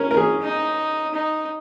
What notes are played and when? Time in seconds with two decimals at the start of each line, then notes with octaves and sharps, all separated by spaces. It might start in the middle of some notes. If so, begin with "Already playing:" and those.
Already playing: C#4 A#4 C#5
0.11 A#4
0.17 G#4
0.41 D#4
1.14 D#4